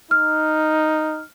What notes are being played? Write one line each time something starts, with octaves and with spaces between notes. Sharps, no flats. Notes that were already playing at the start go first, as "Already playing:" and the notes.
D#4 F6